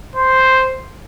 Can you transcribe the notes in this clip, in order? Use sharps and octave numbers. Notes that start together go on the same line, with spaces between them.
C5